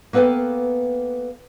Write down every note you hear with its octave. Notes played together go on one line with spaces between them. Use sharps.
A#3 B3 A4 B4 F5 G5